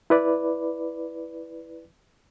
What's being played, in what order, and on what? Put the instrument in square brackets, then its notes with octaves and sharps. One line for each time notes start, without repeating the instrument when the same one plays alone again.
[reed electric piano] E4 B4 D5